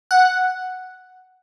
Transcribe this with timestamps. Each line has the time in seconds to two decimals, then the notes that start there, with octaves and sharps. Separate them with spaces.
0.11 F#5